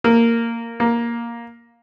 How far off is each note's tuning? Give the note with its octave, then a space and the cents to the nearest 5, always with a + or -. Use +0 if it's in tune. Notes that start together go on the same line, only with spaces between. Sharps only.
A#3 -10
A#3 +10